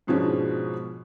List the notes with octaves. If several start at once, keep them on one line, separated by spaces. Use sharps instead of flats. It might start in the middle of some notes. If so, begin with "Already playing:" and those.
G#2 B2 F3 G#3 C#4 D4